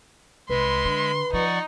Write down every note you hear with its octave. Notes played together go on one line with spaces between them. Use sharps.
C2 G#3 B4 E5 C6
D3
F3 D#4 D5 F#5 C#6